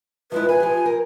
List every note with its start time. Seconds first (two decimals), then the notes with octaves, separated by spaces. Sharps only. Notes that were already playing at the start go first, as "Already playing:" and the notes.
0.32 F3 G#3 E4 B4
0.49 B4 G#5
0.60 F3 G4
0.86 A#4